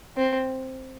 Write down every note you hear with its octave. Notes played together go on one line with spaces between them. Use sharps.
C4